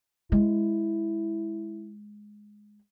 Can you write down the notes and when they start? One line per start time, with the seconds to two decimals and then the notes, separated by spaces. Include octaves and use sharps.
0.32 G#3 E4